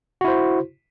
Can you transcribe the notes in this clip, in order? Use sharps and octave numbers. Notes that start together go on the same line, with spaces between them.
E4 F#4 C5